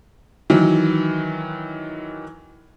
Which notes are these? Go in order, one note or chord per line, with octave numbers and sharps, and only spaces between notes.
D#3 E3 F#3